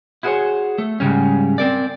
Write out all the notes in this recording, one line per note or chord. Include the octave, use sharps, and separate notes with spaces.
E4 F#4 G#4 A#4 C5 C#5
A3
G#2 C#3 G3 C#4
C4 A#4 D5